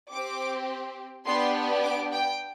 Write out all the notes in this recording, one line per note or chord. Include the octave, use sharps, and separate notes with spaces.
C4 G4 D6
B3 D4 G4 C6
D6
G5